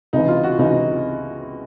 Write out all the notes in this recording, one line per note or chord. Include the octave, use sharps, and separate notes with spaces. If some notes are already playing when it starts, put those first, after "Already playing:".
C#2 C3 E3 D#4
F4
F#4
C#2 C3 E3 D#4